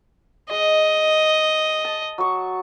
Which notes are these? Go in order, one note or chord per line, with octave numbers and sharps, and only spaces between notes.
G#3 D#5
A5
F#3 C#6 D#6